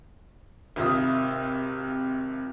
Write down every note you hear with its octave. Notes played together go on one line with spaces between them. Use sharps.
G#1 C3 F4 E5 D#6